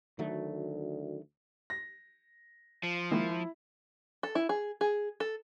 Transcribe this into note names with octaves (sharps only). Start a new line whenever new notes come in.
D2 D#3 F#3 A3
A#6
F3
D#3 G#3 A#3 E4
A4
E4
G#4
G#4
A4